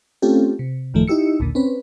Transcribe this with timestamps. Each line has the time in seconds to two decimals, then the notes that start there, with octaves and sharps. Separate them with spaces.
0.22 A3 C4 C#4 F4 G4 A4
0.59 C3
0.94 A1 F#2 D#3 F3 A3
1.08 D#4 E4 G4 E6 C#7
1.40 A#1 D#2 A#2 D3
1.55 C4 C#4 B4